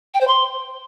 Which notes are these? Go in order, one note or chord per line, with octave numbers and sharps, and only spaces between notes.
G5
C5
C6